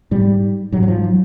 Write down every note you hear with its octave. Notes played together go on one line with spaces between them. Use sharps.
G#2 G3
G#2 F#3
F#3
F3
F#3